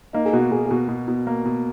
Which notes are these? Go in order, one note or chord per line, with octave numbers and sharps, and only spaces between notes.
A#3 D#4
G#4
B2 F#4
B2 G#4
G#4
B2 F#4
B2
B2
A#3
B2